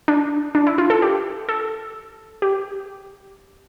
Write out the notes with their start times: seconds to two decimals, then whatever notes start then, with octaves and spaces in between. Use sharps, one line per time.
0.08 D4
0.55 D4
0.67 E4
0.78 F4
0.90 A4
1.02 G4
1.49 A4
2.42 G4